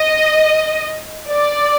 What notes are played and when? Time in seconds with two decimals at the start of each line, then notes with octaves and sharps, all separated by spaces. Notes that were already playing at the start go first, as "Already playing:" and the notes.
Already playing: D#5
1.30 D5